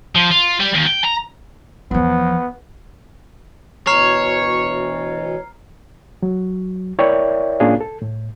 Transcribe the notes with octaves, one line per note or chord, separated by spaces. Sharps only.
F3
F4
G3
D#2
G5
A#5
E2 F3 B3
D2 B2 E3 C#5 A#5 F6 C7
F#3
E4 A#4 C#5 D5 E5 G5
A2 A#3 C#4 D4 F4 G#4
A4
A2